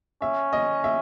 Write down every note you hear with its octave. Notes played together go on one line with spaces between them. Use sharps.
C#4 E5
D#5
E5